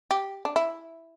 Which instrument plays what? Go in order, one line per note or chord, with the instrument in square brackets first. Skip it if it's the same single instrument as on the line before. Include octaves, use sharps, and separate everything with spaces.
[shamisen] G4
D4
E4